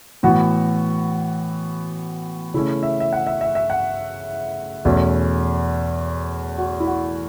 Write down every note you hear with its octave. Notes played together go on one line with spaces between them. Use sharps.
A2 E3 B3 F#4
C#3 A3 C#4 E4
E5
E5
F#5
E5
E5
E5
F#5
E2 B2 A3 C#4
F#4
E4
F#4